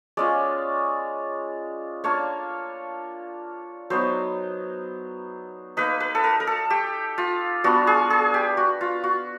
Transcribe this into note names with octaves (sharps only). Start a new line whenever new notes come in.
G#3 C#4 F4 D5
A#3 D4 F4 C#5
F#3 B3 D#4 C5
A#3 D#4 B4
B4
A4
A#4
A#4
A4
G4
F4
G3 B3 D4 F4 F#4
G#4
G#4
G4
F#4
F4
F#4